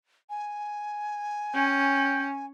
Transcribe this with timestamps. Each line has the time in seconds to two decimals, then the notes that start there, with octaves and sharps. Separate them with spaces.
0.30 G#5
1.55 C#4 G5